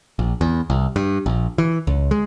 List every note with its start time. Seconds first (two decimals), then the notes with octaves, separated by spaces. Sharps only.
0.19 A#1
0.41 E2
0.70 C2
0.96 G2
1.26 A#1
1.58 E3
1.87 C#2
2.11 G#3